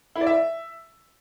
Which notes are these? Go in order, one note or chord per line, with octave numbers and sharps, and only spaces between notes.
E4
D5
E5